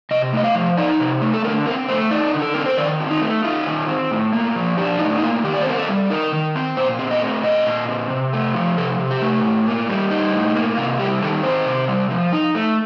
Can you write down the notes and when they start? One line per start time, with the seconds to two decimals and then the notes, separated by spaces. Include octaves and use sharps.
0.11 C3 D#5
0.33 A3 D#5
0.44 F5
0.55 F3
0.77 D#4 D5
1.00 C3
1.21 A3
1.34 A4
1.44 D3 A#4
1.66 C4 A#4
1.89 A3 C5
2.11 D#4 D5
2.34 D3
2.42 A4
2.54 C4 A#4
2.66 C5
2.77 D#3 D5
3.00 C4
3.11 D#4
3.22 A3
3.44 D#4 F4
3.67 D#3
3.88 C4
4.11 A2
4.33 A#3
4.55 F3
4.77 D4 G4
4.99 A2 D#4
5.17 D#4
5.22 A#3 F4
5.44 D#3 G4
5.54 D5
5.62 C5
5.67 C4 A#4
5.77 A4
5.89 G3
6.10 D#4 A#4
6.33 D#3
6.55 C4
6.77 A#2 C5
6.99 C4
7.11 D#5
7.22 A3
7.44 A#2 D#5
7.66 A#2
7.88 C4
8.10 C3
8.33 A3
8.55 F3
8.77 C3 A4
8.99 C3
9.11 G4
9.22 A3
9.44 A2
9.66 A#3
9.89 G3
10.11 D#4
10.32 A2
10.55 A#3
10.77 C3 F4
10.99 G3 G4
11.22 D#3 A4
11.44 C4 C5
11.66 C3
11.88 G3
12.10 F3
12.33 D#4
12.55 A3